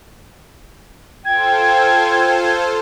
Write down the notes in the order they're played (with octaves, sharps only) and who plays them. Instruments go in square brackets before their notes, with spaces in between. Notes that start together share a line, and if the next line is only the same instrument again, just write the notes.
[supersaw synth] F4 A4 C5 [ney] G5 [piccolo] G#6